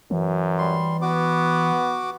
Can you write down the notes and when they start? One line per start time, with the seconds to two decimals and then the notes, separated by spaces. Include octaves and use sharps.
0.11 F#2 E3
0.58 G3 C6
1.02 B3 F#4 D6